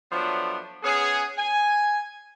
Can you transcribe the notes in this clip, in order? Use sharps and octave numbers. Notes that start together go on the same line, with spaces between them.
F3 F#3 A3 B3 D4
B3 C#4 G#4
G#5